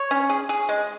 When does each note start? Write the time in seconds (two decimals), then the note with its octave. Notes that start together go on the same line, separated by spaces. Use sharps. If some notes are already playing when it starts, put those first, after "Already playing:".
Already playing: C#5
0.11 C#4
0.30 G#4
0.49 G#4
0.69 G#3